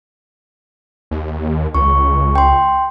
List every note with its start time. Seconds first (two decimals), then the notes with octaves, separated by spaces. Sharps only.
1.11 D#2
1.75 C#2 C#6
2.35 G5 C6